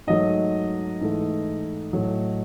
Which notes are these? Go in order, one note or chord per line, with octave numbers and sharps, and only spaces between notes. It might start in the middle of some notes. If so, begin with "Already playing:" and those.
G#2 F#3 A3 D#5
G#2 E3 A3
A2 F#3 A3